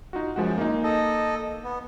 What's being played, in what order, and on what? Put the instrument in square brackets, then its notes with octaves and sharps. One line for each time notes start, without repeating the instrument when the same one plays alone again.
[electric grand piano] D#4 F4 F#4
[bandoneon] F#2 [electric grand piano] F3 G#3 F#4
[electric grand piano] A#3 D#4
[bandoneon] A4 D#5
B3